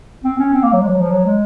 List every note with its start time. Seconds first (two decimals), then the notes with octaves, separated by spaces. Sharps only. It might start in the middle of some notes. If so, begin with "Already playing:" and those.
0.24 C4
0.39 C#4
0.54 C4
0.63 A#3
0.73 F#3
0.82 G#3
0.87 F3
0.92 F#3
1.02 F3
1.11 F#3
1.26 G#3